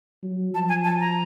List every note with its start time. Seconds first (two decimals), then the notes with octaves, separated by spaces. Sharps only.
0.23 F#3
0.54 F3 A5
0.69 G#5
0.84 A5
1.00 A#5